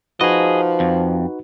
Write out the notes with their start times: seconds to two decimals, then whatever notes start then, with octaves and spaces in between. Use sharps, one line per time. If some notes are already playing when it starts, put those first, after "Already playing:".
0.21 F3 D#4 F#4 G#4 B4 D#5
0.80 F2